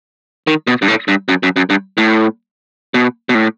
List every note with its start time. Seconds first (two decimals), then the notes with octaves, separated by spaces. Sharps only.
0.47 D#3
0.67 B2
0.82 G2
0.88 A2
1.08 G2
1.29 F#2
1.43 F#2
1.56 F#2
1.70 G2
1.98 A2
2.94 B2
3.29 B2
3.35 A2